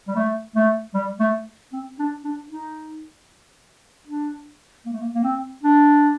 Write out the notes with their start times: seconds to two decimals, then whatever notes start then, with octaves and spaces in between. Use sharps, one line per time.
0.08 G3
0.16 A3
0.56 A3
0.94 G3
1.20 A3
1.73 C4
1.99 D4
2.24 D4
2.50 D#4
4.07 D4
4.86 A#3
4.93 A3
5.00 A#3
5.15 A#3
5.24 C4
5.63 D4